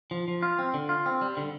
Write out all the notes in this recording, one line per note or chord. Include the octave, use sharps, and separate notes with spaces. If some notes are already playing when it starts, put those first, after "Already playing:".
F3
F3
F4
C4
D3
F4
C4
G3
D3